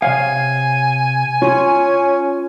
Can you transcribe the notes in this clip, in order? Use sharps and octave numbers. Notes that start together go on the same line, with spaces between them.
C3 C#5 F5 G#5
C#4 F4